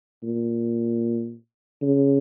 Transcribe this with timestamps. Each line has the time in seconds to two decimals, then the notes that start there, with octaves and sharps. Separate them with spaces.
0.23 A#2
1.82 C#3